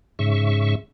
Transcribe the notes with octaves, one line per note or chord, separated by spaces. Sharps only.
G#2 C#3 E5 C#6